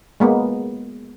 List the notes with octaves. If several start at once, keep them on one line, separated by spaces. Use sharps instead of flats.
G#3 A#3 B3